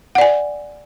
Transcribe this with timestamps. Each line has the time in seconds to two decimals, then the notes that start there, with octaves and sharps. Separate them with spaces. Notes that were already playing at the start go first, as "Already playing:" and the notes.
0.15 F#5
0.18 D5
0.21 G#5